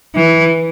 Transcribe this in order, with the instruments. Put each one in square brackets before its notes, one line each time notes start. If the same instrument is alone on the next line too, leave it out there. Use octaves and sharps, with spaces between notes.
[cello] E3